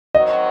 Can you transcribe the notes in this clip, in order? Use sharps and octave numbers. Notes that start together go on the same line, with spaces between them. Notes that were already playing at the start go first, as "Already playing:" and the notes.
D#3 F#3 C4 F#4 D#5